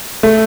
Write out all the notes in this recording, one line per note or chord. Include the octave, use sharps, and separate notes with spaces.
A3